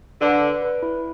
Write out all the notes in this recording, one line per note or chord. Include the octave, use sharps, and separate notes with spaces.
D3 B4
B4
B4
E4